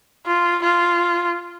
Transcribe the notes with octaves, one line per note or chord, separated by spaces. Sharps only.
F4
F4